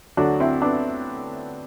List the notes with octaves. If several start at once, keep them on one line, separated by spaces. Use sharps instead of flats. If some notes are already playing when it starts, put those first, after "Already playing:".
D2 D3 F#3 D4 F#4
C4 E4
B3 D4